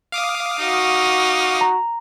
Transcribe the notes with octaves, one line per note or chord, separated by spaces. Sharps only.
F5 D6 D#6
D#4 F#4
A#5